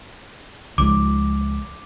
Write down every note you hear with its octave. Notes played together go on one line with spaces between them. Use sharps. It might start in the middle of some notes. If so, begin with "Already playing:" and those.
C#2 F3 G#3 D6